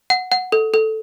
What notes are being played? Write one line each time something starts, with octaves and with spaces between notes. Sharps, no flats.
F#5
F#5
A4
A4